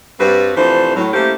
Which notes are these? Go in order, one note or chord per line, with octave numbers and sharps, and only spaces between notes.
G2 G3 C4 F#4 B4
C3 E3 F3 A3 D4 C5
A2 F#3
A3 A#3 C#4 E4 G4 C5